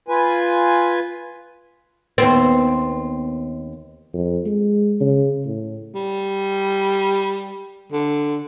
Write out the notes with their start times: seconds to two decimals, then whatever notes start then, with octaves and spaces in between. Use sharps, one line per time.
0.08 F4 B4 G#5
2.18 D#2 B3 C4
4.13 F2
4.46 G#3
5.01 C#3
5.46 A2
5.94 G3
7.92 D3